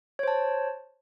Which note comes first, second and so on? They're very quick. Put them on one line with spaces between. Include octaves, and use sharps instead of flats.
C#5 C5 A5